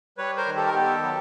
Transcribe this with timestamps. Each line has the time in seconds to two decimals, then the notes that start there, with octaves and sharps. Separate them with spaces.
0.18 G3 B4 C#5
0.37 A#4 C5
0.47 D#3
0.56 G4 A4
0.67 A#4
0.74 B3 G4 A4
1.03 F#3